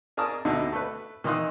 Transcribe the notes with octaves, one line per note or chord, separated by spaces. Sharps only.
G#4 A#4 D5 A5 D#6
D2 B2 D3 D#4 E4
A3 B4
D#3 E3 D#4 C6 D#6 F#6